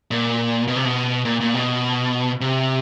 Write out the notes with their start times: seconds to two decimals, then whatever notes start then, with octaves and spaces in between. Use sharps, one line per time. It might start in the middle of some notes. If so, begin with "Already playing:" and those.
0.11 A#2
0.68 B2
0.76 C3
0.85 B2
1.25 A#2
1.40 A#2
1.54 B2
2.41 C3